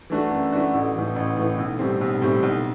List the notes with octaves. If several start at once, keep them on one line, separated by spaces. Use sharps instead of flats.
E3 A3 D4 F#4
F#2
E3 A3 D4 F#4
A1
A2 E3
A1
A2 E3
B1
A2 G3 C4
B1
A2 G3 C4
B1